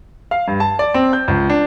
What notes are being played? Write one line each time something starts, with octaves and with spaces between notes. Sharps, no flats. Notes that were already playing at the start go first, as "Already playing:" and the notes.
F5
G2
A5
D5
C4
G6
C#2
D4